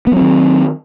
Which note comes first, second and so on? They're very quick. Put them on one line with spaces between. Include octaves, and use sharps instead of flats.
B3 F#3 C4 D#3